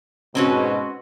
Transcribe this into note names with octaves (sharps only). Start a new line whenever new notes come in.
G#2 B2 C4 C#4 F#4